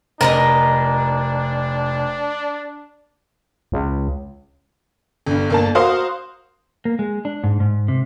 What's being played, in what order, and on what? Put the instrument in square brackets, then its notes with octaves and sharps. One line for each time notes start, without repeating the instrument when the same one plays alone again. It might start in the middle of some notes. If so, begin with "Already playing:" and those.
[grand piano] F1 [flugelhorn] D4 [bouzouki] A#4 B4 D#5
[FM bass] C#2
[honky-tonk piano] G1 G2
G1 A#3 A5
F#4 A#4 C5 F5 C6 D#6
[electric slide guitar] A#3
G#3
D4
G#2
G#2
C3